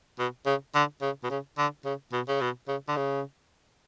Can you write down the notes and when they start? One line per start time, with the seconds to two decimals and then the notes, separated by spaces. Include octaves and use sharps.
0.19 B2
0.46 C#3
0.75 D3
1.01 C#3
1.24 B2
1.30 C#3
1.58 D3
1.85 C#3
2.12 B2
2.28 C#3
2.41 B2
2.68 C#3
2.88 D3
2.96 C#3